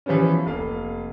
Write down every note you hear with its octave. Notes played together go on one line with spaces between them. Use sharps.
E3 F3 G3 B3 C#4
F1 A#3 F5